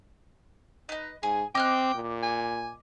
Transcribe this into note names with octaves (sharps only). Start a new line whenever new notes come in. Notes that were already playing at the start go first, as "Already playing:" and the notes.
D#4 B4 D#5
G#2 G#4 G#5
C4 D#5 G5 D6 F6 F#6
A#2
G#5